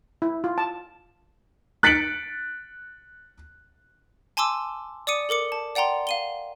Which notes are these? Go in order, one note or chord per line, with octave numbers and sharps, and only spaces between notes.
E4
F4
A5
F#6 A6 B6 C#7 D7 F#7
G#5 A5 C6 D6 E6
D5 D6 D#6 C#7 D#7
A4 A#4 D6 C#7
A5
D5 F#5 G5 A#5 C6
F5 D#7 G7